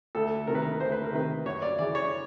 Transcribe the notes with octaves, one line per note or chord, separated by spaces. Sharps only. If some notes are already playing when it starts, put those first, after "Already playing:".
D2 A4
C3 D#3 A#4
B4
A#4
D2 C5
B4
A#4
C3 D#3 B4
F#2 C#5
D5
C#3 E3 D5
C#5